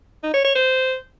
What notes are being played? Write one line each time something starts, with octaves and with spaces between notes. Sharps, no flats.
D#4
C#5
C#5
C5